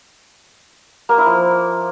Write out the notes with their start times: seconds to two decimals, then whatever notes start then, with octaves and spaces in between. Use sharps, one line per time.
1.09 A#3
1.18 E4
1.27 F3